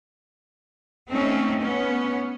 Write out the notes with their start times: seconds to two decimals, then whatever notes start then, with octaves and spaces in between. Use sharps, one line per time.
1.11 A3 C4 C#4 D#4
1.61 B3 C#4